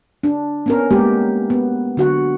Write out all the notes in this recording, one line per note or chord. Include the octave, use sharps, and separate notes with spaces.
D4
B3 C#4 A#4
G#3 A#3 B3 G4
B3
D3 F#4 F#5